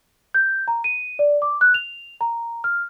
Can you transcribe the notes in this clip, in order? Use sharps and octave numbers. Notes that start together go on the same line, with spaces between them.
G6
A#5
D#7
D5
D6
F#6
F7
A#5
F6